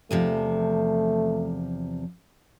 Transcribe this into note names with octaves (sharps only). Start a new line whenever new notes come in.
E2 C3 F3 A3